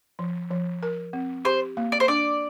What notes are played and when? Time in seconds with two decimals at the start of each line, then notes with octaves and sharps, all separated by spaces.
0.19 F3
0.51 F3
0.83 A#4
1.13 C4
1.45 G4 C5
1.77 A#3
1.92 D5
2.00 C5
2.08 D4 D5